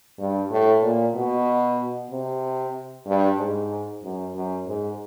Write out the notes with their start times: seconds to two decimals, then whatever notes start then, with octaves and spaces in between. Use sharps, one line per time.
0.19 G2
0.51 A2
0.83 A#2
1.15 B2
2.11 C3
3.06 G2
3.39 G#2
4.03 F#2
4.35 F#2
4.67 G#2